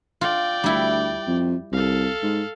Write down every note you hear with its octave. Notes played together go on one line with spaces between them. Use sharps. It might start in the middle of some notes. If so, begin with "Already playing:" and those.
F4 D5 G5
D2 G3 E4
F2
C2 A4 F5
G#2